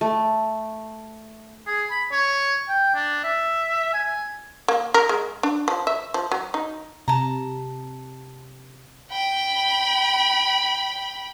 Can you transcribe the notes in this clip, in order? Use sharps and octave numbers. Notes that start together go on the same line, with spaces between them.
A3
G#4
B5
C#5
G5
D4
E5
G#5
A#3
A#4
G#3
D4
F3
E5
F3
F#3
D#4
C3 A5 A#5
G5 B5